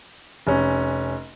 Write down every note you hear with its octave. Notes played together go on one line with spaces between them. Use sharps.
F1 C#4